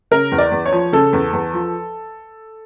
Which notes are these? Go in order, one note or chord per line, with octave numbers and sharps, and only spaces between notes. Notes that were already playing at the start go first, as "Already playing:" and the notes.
C#3 A#4
E2
D5
E2
C#5
F3
C#3 A4
E2
E2
F3